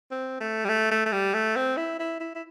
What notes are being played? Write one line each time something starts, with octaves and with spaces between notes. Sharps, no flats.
C4
A3
G3
A3
A3
A3
G3
A3
C4
E4
E4
E4
E4